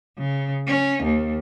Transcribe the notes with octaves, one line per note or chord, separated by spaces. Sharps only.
C#3
C#4
D#2